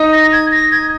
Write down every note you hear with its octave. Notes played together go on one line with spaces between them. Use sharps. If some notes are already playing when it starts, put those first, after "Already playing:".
Already playing: D#4 D#5
A#6
G#6
A#6
G#6